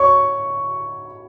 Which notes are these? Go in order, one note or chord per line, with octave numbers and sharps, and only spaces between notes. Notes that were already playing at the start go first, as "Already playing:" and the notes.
Already playing: C#5 C#6